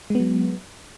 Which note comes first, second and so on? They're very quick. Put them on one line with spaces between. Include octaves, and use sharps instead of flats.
G#3 B3 F#3